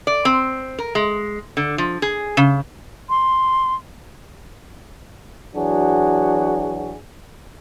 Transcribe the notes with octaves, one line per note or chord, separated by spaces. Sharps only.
D5
C4
A#4
G#3
D3
F3
G#4
C#3
C6
E3 F#3 D4 F#4 G#4